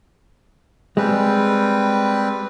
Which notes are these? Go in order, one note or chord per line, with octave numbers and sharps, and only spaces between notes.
G3 G#3 C4 B4